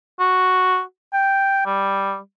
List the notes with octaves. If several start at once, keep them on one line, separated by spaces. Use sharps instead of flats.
F#4
G5
G3